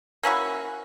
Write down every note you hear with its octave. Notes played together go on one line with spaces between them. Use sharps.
A#3 C#4 E4 F#4